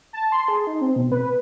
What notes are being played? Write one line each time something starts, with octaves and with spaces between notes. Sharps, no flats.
A5
C6
G#4
D#4
C4
B2
B4